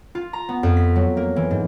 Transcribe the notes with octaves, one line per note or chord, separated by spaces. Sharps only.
F4
A#5
B3
F2
B6
F#3
A#3
E3
G#2